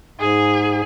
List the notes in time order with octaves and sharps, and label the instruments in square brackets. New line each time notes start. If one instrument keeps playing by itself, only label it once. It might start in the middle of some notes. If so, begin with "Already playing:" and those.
[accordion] G#2 [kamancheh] G#4